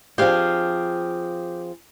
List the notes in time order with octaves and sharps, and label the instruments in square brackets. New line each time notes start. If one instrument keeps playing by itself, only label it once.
[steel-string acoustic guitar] F3 C4 G#4 [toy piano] D4 C5 D5 [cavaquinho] G4 F5